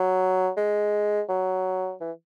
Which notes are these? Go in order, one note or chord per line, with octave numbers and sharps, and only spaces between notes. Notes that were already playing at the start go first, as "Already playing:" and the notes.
Already playing: F#3
G#3
F#3
E3